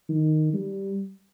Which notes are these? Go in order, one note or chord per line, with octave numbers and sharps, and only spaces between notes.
D#3
G3